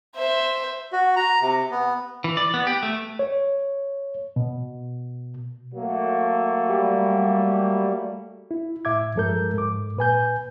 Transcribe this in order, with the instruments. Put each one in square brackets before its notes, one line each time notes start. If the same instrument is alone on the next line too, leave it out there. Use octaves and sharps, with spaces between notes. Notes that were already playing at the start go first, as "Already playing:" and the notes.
[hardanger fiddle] C5 E5
[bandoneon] F#4
A#5
C3
B3
[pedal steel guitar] E3
D5
B3
G4
A3
[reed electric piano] C#5
B2
[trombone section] F#3 A3 A#3
[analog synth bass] G3
[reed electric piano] E4
A2 E5 D6 G#6
G2 F3 G#3 A4 A#4 G6
G#2 D6
A#2 B4 G#5 G6